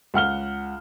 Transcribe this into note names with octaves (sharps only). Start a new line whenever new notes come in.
C#2 F#5 F6 G7